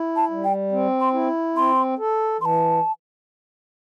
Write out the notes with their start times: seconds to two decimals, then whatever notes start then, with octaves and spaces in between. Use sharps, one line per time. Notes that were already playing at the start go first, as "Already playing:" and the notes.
Already playing: E4
0.16 A5
0.31 G3
0.44 G5
0.72 C4
1.01 C6
1.14 E4
1.56 C4 C6
1.99 A4
2.41 E3 C6
2.45 A5